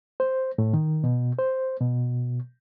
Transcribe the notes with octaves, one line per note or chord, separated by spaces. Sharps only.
C5
A2
D#3
B2
C5
B2